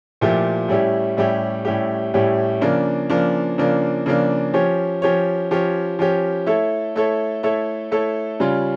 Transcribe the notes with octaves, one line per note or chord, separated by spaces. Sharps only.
A#2 F3 A3 E4 G4
A2 G3 C#4 E4 G4
A2 G3 C#4 E4 G4
A2 G3 C#4 E4 G4
A2 G3 C#4 E4 G4
C#3 F3 A#3 D4
C#3 F3 A#3 D4
C#3 F3 A#3 D4
C#3 F3 A#3 D4
F3 C#4 G4 C#5
F3 C#4 G4 C#5
F3 C#4 G4 C#5
F3 C#4 G4 C#5
A3 E4 A4 C#5
A3 E4 A4 C#5
A3 E4 A4 C#5
A3 E4 A4 C#5
C#3 G3 C#4 F4